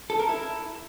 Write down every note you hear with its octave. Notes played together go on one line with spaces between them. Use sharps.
A4
A#4
E4